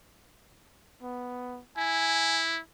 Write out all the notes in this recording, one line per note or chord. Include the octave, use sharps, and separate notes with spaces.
B3
E4 G#5